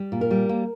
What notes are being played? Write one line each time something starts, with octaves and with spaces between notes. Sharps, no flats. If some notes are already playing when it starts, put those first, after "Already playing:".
Already playing: G3
A#2
A#4
G3
A#3